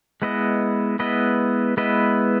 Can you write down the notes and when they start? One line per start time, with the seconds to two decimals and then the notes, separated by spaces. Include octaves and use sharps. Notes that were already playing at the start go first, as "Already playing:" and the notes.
0.22 G#3 B3 E4 B4 D#5
0.99 G#3 B3 E4 B4 D#5
1.77 G#3 B3 E4 B4 D#5